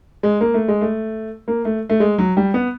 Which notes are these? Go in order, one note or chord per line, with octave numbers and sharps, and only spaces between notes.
G#3
A#3
A3
G#3
A3
A#3
A3
A3
G#3
F#3
G3
B3